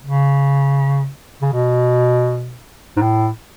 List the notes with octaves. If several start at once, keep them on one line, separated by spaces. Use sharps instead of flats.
C#3
C#3
B2
G#2
A2